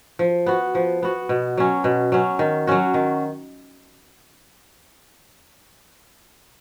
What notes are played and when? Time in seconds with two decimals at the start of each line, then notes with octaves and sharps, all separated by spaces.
0.19 F3
0.46 B3 F#4
0.75 F3
1.02 B3 F#4
1.29 B2
1.57 F#3 C#4
1.84 B2
2.12 F#3 C#4
2.39 D#3
2.67 F#3 C#4 F#4
2.94 D#3